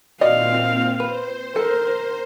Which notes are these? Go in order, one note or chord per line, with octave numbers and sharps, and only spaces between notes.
A#2 C4 F#4 D5 D#5 F5
B4 C5
A4 A#4